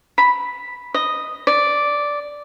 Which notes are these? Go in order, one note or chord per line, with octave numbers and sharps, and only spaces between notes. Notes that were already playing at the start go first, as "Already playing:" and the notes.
B5
D#5
D5